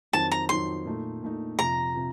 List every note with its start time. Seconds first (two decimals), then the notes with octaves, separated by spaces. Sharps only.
0.13 F2 D#3 F#3 C4 D#4 A5
0.31 A#5
0.49 F2 D#3 F#3 C4 D#4 C6
0.85 A#2 A3 D#4
1.23 A#2 A3 D#4
1.59 F2 C3 F3 A#5
1.95 C3 F3